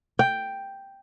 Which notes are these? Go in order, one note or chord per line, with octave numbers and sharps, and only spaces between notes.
G5